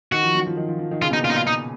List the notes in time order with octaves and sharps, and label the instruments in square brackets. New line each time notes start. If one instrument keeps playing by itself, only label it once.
[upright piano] D#3 [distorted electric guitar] F#4
[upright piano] F3
F#3
F3
D#3
F3
F3
D#3
[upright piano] C#3 [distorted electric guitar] F4
[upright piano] B2 [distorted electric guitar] D#4
[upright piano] A#2
[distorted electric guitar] F4
[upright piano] B2 [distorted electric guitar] D#4
[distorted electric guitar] F4
D#4